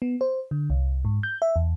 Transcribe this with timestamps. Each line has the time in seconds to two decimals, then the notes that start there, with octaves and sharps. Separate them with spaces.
0.02 B3
0.21 C5
0.51 D3
0.70 C2
1.05 G#2
1.23 G6
1.42 E5
1.56 E2